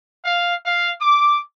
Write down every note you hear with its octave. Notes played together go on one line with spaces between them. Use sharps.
F5
F5
D6